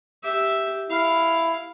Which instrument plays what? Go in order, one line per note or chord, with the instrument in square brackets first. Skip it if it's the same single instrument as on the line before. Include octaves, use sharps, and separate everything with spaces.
[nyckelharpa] G4 E5
[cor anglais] E4 [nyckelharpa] F5